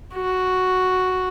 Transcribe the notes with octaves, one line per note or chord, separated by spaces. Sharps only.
F#4